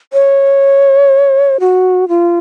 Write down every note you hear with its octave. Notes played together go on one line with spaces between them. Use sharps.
C#5
F#4
F4